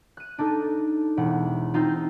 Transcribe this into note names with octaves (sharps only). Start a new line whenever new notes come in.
F#6 D#7
D4 D#4 A4
E1 F#5
C4 D#4 F4